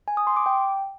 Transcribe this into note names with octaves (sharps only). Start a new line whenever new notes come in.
G#5
D#6
C6
D6
G5